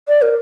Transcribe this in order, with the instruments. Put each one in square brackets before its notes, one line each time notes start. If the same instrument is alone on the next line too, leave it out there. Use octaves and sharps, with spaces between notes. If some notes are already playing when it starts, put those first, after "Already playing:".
[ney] D5
A#4